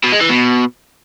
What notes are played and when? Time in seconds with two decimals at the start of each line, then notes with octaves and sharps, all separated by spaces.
0.04 B2
0.12 G#3
0.21 E3
0.29 B2